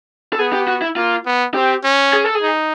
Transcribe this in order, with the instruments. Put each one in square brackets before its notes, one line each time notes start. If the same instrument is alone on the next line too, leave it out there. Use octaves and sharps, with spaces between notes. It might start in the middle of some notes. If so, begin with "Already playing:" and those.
[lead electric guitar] A4
[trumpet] B3 [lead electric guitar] G#4
[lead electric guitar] G4
F#4
E4
[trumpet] A#3 [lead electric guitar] F4
[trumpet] B3
[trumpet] C4 [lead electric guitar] G4
[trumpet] C#4
[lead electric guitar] G#4
A4
G#4
[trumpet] D#4